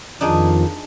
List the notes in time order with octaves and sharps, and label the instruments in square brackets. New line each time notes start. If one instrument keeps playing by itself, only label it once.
[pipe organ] F2 D#3 F3 [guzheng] D4 D#4 G#4